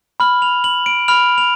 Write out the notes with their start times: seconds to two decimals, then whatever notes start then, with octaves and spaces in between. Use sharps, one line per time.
0.20 B5 F6 F#7
0.42 F7
0.64 F#7
0.86 D7
1.08 B5 F6 F7
1.38 F7